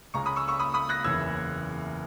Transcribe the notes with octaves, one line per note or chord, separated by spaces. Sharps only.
C#2 C#3 G#3 A#5 C#6
B5 D#6
C#6 E6
C#6 E6
B5 D#6
B5 D#6
F#6 A#6
F#1 E2 C#3 E6 G#6